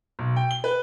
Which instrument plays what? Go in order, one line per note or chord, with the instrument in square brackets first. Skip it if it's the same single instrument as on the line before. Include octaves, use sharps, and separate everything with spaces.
[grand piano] B1
G5
G7
B4